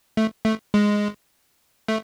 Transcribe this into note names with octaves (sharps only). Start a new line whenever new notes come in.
A3
A3
G#3
A3